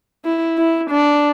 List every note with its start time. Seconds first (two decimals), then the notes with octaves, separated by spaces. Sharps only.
0.25 E4
0.58 E4
0.90 D4